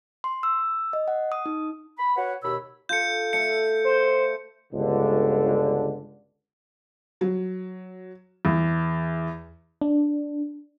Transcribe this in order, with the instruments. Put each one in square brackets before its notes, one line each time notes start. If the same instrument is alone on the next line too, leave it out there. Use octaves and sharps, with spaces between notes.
[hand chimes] C6
E6
D#5
F#5
D#6
D#4
[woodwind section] B5
F#4 B4 C#5 F#5
D#2 B2 C#5 B5 E6
[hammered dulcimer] F4 A4 [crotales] G6 C#7
[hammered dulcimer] A3 E5 [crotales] C#7
[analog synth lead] C5
[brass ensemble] G1 C#2 D3
[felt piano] F#3
E2
[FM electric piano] D4